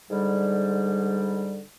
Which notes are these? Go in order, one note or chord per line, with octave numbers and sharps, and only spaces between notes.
G#2 D3 G3